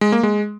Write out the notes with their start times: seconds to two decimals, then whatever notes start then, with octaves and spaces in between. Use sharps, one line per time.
0.01 G#3
0.12 A#3
0.23 G#3